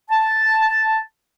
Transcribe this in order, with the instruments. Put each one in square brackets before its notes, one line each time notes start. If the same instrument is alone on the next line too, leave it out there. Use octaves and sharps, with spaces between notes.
[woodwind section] A5